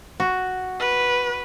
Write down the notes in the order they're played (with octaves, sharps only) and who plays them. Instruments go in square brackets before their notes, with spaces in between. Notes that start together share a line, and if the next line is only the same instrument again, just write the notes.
[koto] F#4
[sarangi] B4